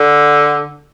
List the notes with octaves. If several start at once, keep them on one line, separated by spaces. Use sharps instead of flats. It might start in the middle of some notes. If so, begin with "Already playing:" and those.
Already playing: D3